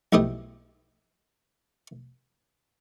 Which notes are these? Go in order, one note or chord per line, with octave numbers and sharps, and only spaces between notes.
B1 A3 E4 G4 D#5